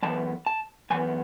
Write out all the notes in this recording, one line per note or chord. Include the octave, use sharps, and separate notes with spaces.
F#2 E3 B3 A5
A5
F#2 E3 B3 G#5